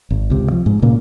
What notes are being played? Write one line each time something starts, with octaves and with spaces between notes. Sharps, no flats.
G#1
C#2 C3
F3
G#2
A#2 C#3 A#3